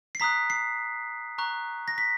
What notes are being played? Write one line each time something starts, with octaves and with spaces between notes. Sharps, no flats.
C7
A#5 D#6 F#6 B6
C7
A#5 C#6 F#6
A#6
B6